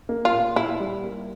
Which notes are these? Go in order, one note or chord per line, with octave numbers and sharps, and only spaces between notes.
A#3
F4
A#2
A#2 E4
G3
A#3